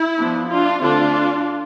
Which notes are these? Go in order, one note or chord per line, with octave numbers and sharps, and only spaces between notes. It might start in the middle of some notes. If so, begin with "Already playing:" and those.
Already playing: E4
F3 B3 D4
D4 F4
D3 A3 C4 D4 F4